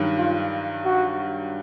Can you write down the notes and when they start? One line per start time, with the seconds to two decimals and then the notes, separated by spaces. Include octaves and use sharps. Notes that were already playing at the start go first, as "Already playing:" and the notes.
Already playing: G2 D#3 F#3
0.18 F4
0.85 F#4